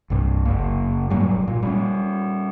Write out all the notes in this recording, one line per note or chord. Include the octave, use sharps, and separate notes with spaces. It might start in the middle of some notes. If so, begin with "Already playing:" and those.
C2 G2
F#1 A#3
E1 G#2 F#3 G3
A#2
G3 G#3 C#4